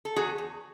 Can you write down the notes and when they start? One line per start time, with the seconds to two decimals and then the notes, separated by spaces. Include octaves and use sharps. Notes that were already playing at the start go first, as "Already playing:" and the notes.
0.05 A4
0.16 E2 F#4 G#4
0.38 E2